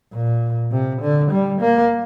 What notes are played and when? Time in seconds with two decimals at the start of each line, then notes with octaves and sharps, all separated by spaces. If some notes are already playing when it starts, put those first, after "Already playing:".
0.13 A#2
0.71 C3
1.01 D3
1.31 G3
1.61 A#3